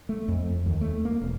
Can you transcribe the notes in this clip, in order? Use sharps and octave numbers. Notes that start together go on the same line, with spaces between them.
A3
F2
D#2
A3
A#3
E1